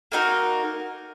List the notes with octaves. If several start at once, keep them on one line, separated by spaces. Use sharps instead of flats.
A#3 D#4 F#4 A#4